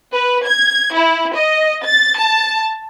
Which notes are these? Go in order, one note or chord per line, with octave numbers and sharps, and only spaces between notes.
B4
G#6
E4
D#5
A6
A5